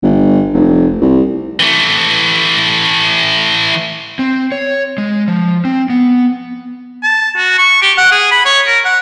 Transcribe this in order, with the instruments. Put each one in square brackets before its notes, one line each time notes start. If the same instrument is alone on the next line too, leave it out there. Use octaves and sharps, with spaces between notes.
[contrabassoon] G1
F1
C2
[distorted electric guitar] E3 A3
[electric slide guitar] C4
C#5
G#3
F3
C4
B3
[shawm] A5
F#4
C#6
G4
F#5
G#4
B5
C#5
A#4
F#5